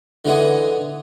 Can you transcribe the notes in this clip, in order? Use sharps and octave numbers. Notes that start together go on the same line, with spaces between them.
D3 E3 G#3 B3 G#4